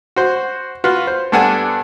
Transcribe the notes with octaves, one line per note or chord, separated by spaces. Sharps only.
F#4 C5
F4 F#4 B4
C5
G2 B3 D4 A4 F#5 G#5